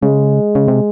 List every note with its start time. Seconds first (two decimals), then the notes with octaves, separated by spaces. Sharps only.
0.01 C#3 G#3
0.55 C#3
0.68 C3